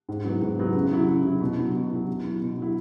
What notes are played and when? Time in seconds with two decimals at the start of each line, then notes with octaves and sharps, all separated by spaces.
0.09 G#2
0.25 F#3 B3 E4
0.42 G#2
0.58 F#3 B3 E4
0.74 C#3
0.92 F#3 E4
1.08 C#3
1.24 F#3 E4
1.41 B2
1.58 F#3 E4
1.75 B2
1.91 F#3 E4
2.08 B2
2.24 F#3 E4
2.41 B2
2.58 F#3 E4